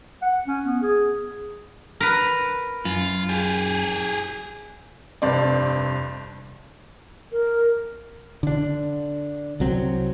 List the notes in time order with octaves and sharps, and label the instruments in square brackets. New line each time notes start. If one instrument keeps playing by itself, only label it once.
[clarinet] F#5
C#4
B3
G#4
[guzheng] A#4 B4
[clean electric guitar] F#2 [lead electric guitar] F4
[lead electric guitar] G4 G#4
[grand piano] F1 G2 C4 D5
[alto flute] A#4
[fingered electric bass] D3 D4
C2 F#3 C4